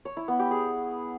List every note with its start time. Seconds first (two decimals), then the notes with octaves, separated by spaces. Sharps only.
0.05 C#5
0.17 E4
0.28 B3
0.39 G4
0.51 G#4